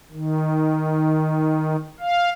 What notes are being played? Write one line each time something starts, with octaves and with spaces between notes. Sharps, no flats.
D#3
F5